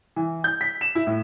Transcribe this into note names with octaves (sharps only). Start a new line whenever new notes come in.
E3
G6
B6
E7
E4
A2